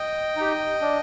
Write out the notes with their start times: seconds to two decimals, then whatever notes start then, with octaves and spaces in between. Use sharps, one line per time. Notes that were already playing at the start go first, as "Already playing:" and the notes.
Already playing: D#5 G5
0.36 D#4 G4
0.82 D4